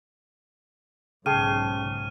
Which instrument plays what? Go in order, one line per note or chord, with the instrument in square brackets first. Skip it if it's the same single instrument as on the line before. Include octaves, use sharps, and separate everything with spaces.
[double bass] B1 G#2 [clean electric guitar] C#3 [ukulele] G#4 G5 A5 [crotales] F6 D#7